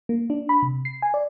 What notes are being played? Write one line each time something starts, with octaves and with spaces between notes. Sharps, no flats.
A#3
D4
B5
C3
C7
G#5
D5